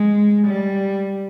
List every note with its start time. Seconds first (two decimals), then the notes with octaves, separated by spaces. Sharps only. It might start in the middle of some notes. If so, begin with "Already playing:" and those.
Already playing: G#3
0.46 G3